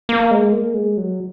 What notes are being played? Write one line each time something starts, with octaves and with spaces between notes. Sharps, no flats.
A#3
G#3
A#3
G#3
F#3